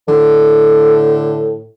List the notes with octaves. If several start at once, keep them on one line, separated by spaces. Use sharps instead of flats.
A2 D3